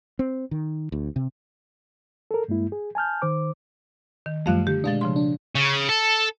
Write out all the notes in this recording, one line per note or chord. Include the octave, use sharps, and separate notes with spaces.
C4
D#3
D2
C3
A4 A#4
G2 G#3 A#3 E4
G#4
G#5 A5 F6 G6
D#3 C5 D6
D#3
F#2 F3 G3 A3 F5 F#6
D3 G4
B2 G#3 D4 F5 A6
C#3 F3 C6
D4
C#3
A4